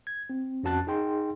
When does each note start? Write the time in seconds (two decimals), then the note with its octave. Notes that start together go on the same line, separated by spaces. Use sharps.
0.07 G#6
0.30 C4
0.63 F2 C#4 F#4 A5 F#6 A6
0.87 D#4 G#4 G5 C6